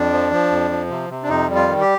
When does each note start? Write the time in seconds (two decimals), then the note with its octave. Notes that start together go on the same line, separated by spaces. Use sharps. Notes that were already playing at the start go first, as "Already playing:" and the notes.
Already playing: F2 D4
0.12 F3
0.32 F3
0.51 F2
0.71 F3
0.90 C3
1.10 C3
1.23 D4
1.29 F2 D#4
1.49 G3
1.55 F4
1.68 D#3
1.81 G4